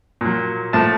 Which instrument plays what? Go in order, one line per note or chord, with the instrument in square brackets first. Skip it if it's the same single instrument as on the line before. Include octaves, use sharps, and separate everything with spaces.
[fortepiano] A#2 F#3
A2 F3 A5